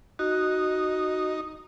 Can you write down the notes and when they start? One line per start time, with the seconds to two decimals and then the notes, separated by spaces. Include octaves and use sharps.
0.19 D#4 F#4